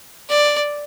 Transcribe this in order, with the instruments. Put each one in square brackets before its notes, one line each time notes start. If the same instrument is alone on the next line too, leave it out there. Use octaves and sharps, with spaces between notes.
[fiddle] D5